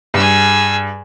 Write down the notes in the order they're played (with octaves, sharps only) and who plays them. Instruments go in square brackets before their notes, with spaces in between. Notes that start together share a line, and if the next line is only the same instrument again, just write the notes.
[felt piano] G2 [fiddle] G#4 E6